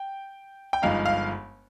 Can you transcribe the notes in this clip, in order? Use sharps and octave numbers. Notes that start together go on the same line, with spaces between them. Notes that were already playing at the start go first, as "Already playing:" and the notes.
Already playing: G5
G5
G1 G2 F3 G#3 D#4 F5
F5